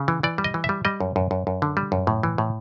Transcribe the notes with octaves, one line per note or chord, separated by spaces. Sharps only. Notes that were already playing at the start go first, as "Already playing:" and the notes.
Already playing: C#3
E3
E3 D5
G3
D#5
E3
E5
G3
G3 D#5
F#2
F#2
F#2
F#2
D3
G3
F#2
A2
E3
A2